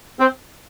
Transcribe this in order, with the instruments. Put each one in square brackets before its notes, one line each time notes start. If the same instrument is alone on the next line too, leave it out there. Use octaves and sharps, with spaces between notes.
[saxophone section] C4